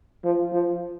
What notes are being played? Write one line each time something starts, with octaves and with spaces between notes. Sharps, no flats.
F3
F3